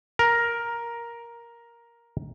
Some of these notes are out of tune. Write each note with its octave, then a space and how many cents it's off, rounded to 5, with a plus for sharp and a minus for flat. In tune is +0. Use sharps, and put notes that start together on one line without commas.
A#4 +10